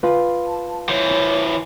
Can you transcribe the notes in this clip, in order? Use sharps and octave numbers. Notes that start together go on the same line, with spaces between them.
F4 B4
A5
E3 C5 C#5